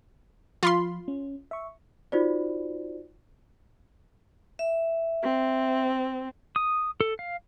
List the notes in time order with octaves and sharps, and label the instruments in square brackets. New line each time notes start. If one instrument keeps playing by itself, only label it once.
[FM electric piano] F3 [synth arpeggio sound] F4 B5 C6
[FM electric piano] C#4
E5 C#6
[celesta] D#4 F4 F#4 C5 D5
[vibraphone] E5
[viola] C4
[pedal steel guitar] D#6
A4
F5